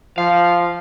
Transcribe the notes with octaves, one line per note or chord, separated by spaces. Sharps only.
F3 F5